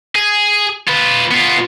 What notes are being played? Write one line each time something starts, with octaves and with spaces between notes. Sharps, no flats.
G#4
F4 B4
B3 F4